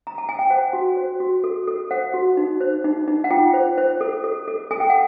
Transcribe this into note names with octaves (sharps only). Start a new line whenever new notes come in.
A#5
A5
G#5
G5
C5 F#5
F#4
C5
F#4
A4
A4
C5 F#5
F#4
D#4
C5
D#4
D#4
F#5
F4 G5
C5
C5
A4
A4
A4
A4 G#5
G5
F#5